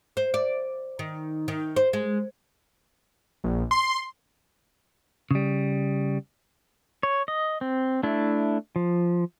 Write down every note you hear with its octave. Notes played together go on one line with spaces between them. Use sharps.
C5
D5
D#3
D#3
C5
G#3
A#1
C6
C#3 G3
C#5
D#5
C4
A3 D4 E4
F3